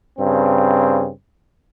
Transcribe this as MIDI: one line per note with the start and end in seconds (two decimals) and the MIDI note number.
0.19 1.10 43
0.19 1.10 49
0.19 1.10 60